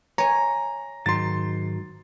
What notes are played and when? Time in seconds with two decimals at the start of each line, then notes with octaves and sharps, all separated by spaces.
0.18 C#5 G#5 A#5
1.06 G#2 D#3 F#3 C6 A6